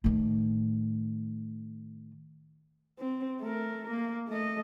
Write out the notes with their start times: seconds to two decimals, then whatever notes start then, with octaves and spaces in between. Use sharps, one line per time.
0.04 A2 D#3
2.99 C4
3.41 A3 A#4
3.90 A#3
4.28 A3 D#5